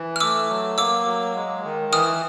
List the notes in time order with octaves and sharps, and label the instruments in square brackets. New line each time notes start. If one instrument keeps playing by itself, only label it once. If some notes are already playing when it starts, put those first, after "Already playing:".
Already playing: [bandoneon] E3
[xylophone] F6
[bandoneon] A3 [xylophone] D6 E6
[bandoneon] F#3
[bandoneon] A#3 [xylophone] D6 E6
[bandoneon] F#3
G#3
D#3
[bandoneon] E3 [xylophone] D#6 F6